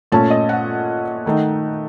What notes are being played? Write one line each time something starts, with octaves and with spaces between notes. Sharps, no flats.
A#2 A3 C#4 A5
D#5
F#5
D#3 A3 D#4